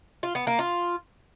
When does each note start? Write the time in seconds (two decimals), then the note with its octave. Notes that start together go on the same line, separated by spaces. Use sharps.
0.23 F4
0.35 B3
0.47 A#3
0.59 F4